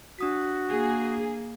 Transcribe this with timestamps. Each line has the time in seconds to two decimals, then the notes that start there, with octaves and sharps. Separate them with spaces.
0.19 D4 F#4 D#6 B6
0.70 A#3 G#4